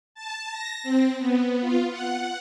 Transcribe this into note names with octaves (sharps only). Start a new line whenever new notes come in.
A5
A#6
C4
B3
F4
F#5